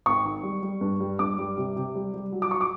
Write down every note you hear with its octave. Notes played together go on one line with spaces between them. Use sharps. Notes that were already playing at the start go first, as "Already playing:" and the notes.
G#1 C#6
D#3
G3
G3
G2
G3
G2 D6
G3
C3
C3
G3
G3
F#3
D6
F#3 C#6
D6